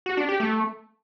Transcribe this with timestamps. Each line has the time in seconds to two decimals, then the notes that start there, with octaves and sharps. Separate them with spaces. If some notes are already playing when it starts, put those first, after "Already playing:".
0.06 F#4
0.17 D4
0.29 G4
0.40 A3